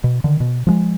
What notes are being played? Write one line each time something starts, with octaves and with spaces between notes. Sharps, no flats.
B2
D3 D#3
B2
F3 F#3 G#3